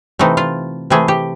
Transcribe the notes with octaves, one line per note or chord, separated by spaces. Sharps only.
C3 E3 A3 D#4
F4
C3 E3 A3 G#4
G4